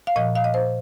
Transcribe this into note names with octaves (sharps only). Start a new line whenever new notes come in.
F5
A#2 F3 D#5
F5
D#5
C5